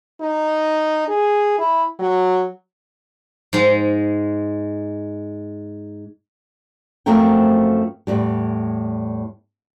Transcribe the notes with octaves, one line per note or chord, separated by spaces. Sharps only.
D#4
G#4
E4
F#3
G#2 G#3
F#2 F3 A3 C4 A#4 G5
E2 A2 G3